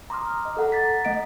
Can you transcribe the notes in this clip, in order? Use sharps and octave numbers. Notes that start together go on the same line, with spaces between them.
A#5 C6 D6 D#6 F6
D#5
A4 F#5 A#5
A#5 D6 A6 B6
A3 D#5 F#5 D7